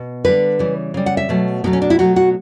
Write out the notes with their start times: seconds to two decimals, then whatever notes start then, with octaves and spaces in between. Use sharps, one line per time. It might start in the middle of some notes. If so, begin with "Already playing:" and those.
Already playing: B2
0.24 D3 G3 B4
0.59 C#3 E3 G3
0.94 C#3 G3
1.06 F#5
1.17 E5
1.29 B2 F#3 A3
1.64 B2 F#3 A3 B3
1.73 C#4
1.82 D4
1.90 E4
1.99 B2 F#3 A3 F#4
2.16 F#4